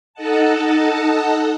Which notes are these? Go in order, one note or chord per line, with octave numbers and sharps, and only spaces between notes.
D#4 A4 D#5 F#5 A5